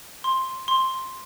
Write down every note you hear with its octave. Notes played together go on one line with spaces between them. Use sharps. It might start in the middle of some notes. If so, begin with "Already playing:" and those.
C6
C6